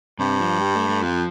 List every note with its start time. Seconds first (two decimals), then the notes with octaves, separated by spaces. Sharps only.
0.19 G2 C3
0.40 F3
0.61 G3
0.75 A3
0.89 A3
1.02 F2 F3